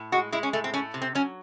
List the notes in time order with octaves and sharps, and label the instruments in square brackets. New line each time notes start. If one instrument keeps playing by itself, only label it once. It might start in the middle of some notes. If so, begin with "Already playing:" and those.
Already playing: [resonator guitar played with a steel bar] A2
G#3 F#4
G#3 E4
C#4
A2 A3
C4
A3 C#4
C3
C4
F#3 C#4